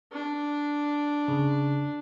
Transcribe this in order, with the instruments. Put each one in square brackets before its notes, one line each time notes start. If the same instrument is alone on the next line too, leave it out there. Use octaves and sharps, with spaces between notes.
[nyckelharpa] D4
[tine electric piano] C#3